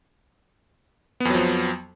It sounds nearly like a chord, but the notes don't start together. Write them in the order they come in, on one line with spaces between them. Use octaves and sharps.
B3 F2 F#3 F3